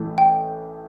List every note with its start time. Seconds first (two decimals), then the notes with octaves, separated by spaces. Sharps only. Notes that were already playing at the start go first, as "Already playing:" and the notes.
Already playing: A1 A2 E3 A3
0.18 G5